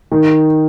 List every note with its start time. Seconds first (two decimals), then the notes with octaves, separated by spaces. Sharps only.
0.12 D#3